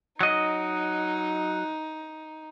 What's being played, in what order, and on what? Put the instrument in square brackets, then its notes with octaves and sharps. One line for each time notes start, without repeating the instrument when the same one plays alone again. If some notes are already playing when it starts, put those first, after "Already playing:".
[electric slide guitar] F#3 D#5 [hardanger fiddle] D#4